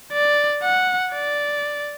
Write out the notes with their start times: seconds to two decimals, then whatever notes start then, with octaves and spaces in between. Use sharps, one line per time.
0.13 D5
0.63 F#5
1.13 D5